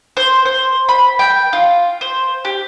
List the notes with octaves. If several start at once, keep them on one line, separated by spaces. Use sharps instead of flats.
C5
C5
B5
G5
F4
C5
G4